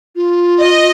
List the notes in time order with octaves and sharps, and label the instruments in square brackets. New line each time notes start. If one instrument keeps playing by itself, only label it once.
[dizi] F4
[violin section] D#5